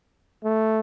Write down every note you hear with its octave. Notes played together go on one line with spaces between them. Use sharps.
A3